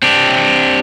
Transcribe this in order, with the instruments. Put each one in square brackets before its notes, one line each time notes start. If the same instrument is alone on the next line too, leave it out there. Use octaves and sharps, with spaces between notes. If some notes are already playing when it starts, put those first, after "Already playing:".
[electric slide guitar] C4 D4 G4